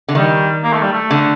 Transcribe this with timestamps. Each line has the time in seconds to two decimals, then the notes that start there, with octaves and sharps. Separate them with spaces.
0.08 D3
0.15 D#3 G3
0.63 A#3
0.73 A3
0.82 G3
0.93 A3
1.11 D3